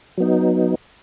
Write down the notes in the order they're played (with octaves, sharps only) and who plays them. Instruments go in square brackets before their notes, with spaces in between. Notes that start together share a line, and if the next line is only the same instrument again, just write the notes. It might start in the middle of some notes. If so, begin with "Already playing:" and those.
[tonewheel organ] F#3 B3 D#4